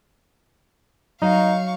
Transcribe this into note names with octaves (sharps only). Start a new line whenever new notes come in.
F#3 D#4 F5 C#6